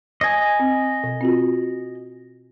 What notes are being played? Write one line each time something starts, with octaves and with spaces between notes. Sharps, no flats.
D#5 G#5
C4
B2
C4 F4 F#4